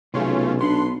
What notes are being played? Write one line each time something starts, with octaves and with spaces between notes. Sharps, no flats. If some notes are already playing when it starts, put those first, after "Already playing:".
B1 C3 A3 B3 C#4 F4 G#4
B3 D4 B4 C6